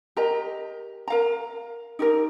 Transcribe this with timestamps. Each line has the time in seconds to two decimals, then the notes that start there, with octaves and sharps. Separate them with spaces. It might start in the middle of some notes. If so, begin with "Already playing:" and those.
0.17 G4 A#4 D#5 A#5
1.08 A#4 F5 A#5
1.99 D#4 G4 A#4